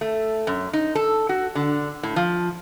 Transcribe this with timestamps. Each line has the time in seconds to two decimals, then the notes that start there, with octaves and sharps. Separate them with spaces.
0.01 A3
0.47 F#2
0.73 D#4
0.95 A4
1.29 F#4
1.55 D3
2.03 A2
2.16 F3